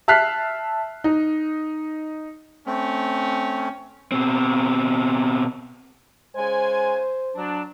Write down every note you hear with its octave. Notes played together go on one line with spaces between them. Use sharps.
E5 A5 F6 F#6 B6 C7
D#4
A3 C4 C#4
B2 C4
C#3 G#3 C5 G#5
F#3 D4